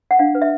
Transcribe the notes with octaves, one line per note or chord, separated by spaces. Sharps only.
F#5
D4 F5
B4
E5